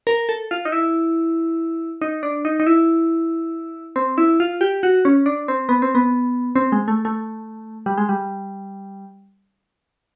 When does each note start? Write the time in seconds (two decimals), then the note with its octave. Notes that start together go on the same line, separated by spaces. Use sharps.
0.07 A#4
0.29 A4
0.51 F4
0.65 D#4
0.72 E4
2.01 D#4
2.23 D4
2.45 D#4
2.60 D#4
2.66 E4
3.96 C4
4.18 E4
4.40 F4
4.61 G4
4.83 F#4
5.05 C#4
5.26 D4
5.48 C4
5.69 B3
5.82 C4
5.95 B3
6.56 C4
6.72 G#3
6.88 A3
7.05 A3
7.86 G3
7.98 G#3
8.09 G3